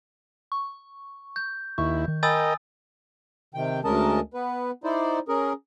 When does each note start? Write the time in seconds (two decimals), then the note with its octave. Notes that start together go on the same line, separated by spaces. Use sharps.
0.52 C#6
1.36 G6
1.78 D#2 E4 C#6
2.08 D#3
2.23 A#4 D#5 G5 G#5 B5 D#6 E6 A6
3.54 C3 D#3 G5
3.84 D2 G#3 C#4 A#4 D#5 A5
4.34 B3 B4
4.84 D#4 E4 C5 D5
5.28 C#4 G#4 A#4